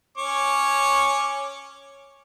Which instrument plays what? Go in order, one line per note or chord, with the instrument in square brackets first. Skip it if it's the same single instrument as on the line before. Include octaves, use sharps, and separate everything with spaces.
[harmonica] C#4 C#5 D6